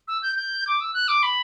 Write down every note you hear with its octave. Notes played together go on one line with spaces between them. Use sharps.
E6
G6
G6
D6
E6
F#6
D6
B5